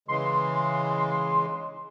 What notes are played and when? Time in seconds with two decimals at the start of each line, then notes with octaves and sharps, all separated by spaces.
0.08 C#3 E3 G#3 C6